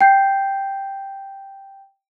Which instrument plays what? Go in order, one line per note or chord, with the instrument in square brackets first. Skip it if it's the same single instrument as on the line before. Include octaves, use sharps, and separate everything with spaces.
[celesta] G5 G6 C7